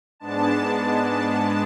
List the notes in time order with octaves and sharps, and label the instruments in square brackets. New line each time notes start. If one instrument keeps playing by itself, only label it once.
[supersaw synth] G#2 G#3 B3 D4 A5
A5